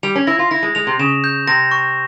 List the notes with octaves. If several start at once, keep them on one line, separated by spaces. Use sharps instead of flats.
G3 F7
C#4
E4 A#6
F4
E4 A#6
G#3
G#3 F7
C3
C#3 E7
G6
C3 A#6
C#6